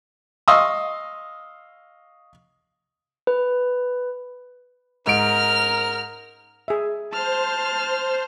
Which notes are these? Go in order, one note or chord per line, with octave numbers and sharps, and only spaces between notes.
D#5 F5 C6 C#6 D#6 E6
B4
G#2 A#4 F6 D7
G#4 E5
C5 A5 F6